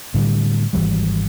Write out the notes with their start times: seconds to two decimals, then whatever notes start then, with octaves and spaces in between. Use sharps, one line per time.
0.14 A2 D3 G3
0.73 G#1 C#2 E3 G3